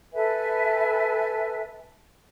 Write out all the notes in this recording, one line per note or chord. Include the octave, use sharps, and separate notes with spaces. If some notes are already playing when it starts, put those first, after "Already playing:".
A4 B4 E5 G#5